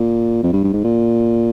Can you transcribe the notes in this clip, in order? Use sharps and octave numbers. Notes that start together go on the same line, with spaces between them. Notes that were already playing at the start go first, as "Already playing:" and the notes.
Already playing: A#2
F2
G2
G2
G#2
A#2